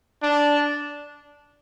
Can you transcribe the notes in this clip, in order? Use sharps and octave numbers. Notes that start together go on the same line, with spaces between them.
D4